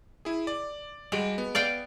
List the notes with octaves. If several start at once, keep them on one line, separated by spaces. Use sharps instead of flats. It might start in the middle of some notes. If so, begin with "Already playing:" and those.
E4 G#4
D5
G3 G#3 F#4 D7
B3
D5 F5 G5